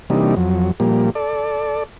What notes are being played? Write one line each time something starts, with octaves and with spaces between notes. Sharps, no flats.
C3 E3 G3 A#3 D4 D#4
F2 F#3
A#2 F3 G3 A#3
A4 D5